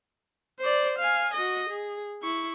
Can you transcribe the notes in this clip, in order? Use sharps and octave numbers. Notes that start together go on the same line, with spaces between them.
C5 D5
F5 G#5
F#4 D#5
G#4
E4 C#6